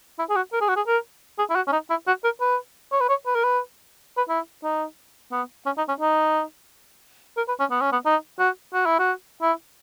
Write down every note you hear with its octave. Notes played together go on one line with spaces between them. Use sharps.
E4
G#4
F#4
A#4
G#4
F#4
G#4
A#4
G#4
E4
F#4
C#4
D#4
E4
F#4
A#4
B4
C#5
B4
C#5
B4
A#4
B4
B4
E4
D#4
B3
C#4
D#4
C#4
D#4
A#4
B4
C#4
B3
C#4
B3
D#4
F#4
F#4
E4
F#4
E4